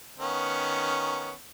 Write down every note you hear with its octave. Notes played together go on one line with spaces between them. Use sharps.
D#3 B3 C#4